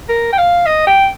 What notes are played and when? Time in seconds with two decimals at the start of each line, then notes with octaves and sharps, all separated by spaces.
0.09 A#4
0.33 G5
0.38 F5
0.66 D#5
0.87 G5